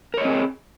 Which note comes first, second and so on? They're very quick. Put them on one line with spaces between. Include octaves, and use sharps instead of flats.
A#4 C#5 D#5 C4 G#4